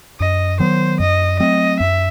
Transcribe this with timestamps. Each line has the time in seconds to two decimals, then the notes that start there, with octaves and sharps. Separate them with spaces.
0.20 F#2 D#5
0.60 D#3 F#3 B3 C5
1.00 F#2 D#5
1.40 F#3 A3 C4 D#5
1.80 F#2 E5